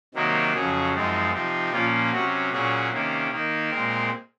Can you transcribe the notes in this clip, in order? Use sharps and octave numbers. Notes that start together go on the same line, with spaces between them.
C3 D#3 F#3 A#3 D#4
F2 C#3 F#3 G#4
F#2 F3 G#3 C4 D#4
C3 F3 C4 D#4
A#2 F3 A#3 C#4 F4
C3 F#3 C#4 F#4
A#2 F#3 C#4 G#4
C3 D#3 A#3 C#4
D#3 A#3 D#4
A#2 G#3 C4 A#4